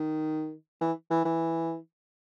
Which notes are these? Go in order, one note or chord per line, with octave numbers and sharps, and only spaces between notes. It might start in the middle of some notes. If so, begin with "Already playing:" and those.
Already playing: D#3
E3
E3
E3